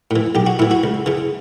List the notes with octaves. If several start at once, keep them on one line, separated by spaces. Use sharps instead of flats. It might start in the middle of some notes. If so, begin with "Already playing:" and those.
A2 E3
B1 G4
F#4
A2 E3 E4
F#4
C#2
C#3 E3